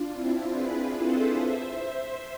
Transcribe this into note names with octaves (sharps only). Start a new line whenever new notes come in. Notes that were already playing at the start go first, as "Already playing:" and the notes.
Already playing: D4 F4
C4 E4
G#4 B4
A4 C5
C5 E5